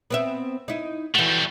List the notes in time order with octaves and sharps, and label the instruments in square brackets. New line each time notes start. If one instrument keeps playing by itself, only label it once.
[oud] B3 C4 E5
D#4 E4
[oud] E3 F#4 [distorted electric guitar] G3 A3